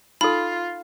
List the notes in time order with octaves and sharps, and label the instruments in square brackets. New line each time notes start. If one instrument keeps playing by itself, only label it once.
[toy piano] D#4 A4 [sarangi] F4 [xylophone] B5